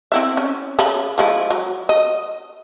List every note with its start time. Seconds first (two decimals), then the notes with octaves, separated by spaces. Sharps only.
0.12 C4 E4 E5
0.37 C#4
0.79 C#3 E5 B5
1.18 F3 G#3 E4
1.50 F#3
1.89 D#5